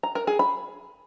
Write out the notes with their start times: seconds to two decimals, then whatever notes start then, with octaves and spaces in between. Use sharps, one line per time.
0.03 A#5
0.15 A#4
0.27 G#4
0.39 B5